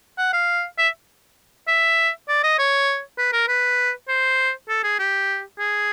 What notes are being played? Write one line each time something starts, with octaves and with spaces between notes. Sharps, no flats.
F#5
F5
E5
E5
D5
D#5
C#5
B4
A#4
B4
C5
A4
G#4
G4
G#4